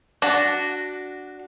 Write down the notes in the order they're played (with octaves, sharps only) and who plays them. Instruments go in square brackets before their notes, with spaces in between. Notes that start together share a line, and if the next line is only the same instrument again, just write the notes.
[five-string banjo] D4 [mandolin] F#4